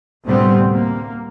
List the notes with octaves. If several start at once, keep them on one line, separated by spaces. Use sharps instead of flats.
D2 A2 C3 G3 B3 C4
A#3